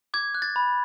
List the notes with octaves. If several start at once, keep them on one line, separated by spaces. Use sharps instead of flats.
D6 G#6
F#6
A6
B5